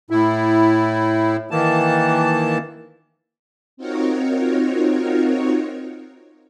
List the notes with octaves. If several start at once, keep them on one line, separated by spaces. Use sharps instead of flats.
A2 E4
D#3 E3 A#3 A5
C4 D#4 F4 F#4 A#4 C#5